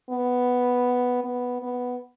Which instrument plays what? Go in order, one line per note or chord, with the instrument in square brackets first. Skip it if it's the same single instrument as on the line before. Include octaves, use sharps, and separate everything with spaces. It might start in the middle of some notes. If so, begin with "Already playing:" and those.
[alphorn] B3
B3
B3